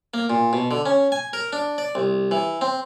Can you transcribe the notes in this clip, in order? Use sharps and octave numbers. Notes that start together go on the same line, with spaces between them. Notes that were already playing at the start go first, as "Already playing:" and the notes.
A#3
A#2
B2
D3
C#4
G#5
A#4
D4
D5
C2
E3
C4